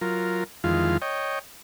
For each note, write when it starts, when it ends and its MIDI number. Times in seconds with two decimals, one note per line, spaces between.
0.01 0.44 54
0.01 0.44 65
0.01 0.44 70
0.64 0.97 41
0.64 0.97 51
0.64 0.97 52
0.64 0.97 56
0.64 0.97 65
0.64 0.97 77
1.02 1.39 73
1.02 1.39 75
1.02 1.39 79